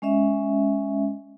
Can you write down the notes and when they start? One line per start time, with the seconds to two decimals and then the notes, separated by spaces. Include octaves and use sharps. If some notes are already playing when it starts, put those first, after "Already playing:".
0.02 G#3 C#4 D#5 E5